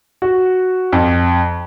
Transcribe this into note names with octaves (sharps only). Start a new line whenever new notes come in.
F#4
F2